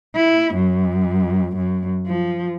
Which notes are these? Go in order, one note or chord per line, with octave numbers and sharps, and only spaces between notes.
E4
F#2
F#2
F3